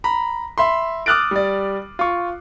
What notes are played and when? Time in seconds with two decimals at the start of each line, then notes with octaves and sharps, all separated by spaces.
0.04 A#5 B5
0.58 E5 B5 C6
1.06 D6 D#6 F6 F#6 A6 D7
1.31 G3 D5
1.99 F4 C#6